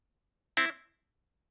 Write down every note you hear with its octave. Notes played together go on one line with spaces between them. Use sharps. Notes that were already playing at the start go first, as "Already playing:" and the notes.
C4 E4